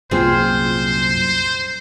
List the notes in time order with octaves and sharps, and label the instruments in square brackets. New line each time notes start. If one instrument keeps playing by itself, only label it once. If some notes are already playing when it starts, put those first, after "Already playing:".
[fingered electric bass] C2 F#2 A#2 [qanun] C4 F4 G#4 [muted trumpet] C5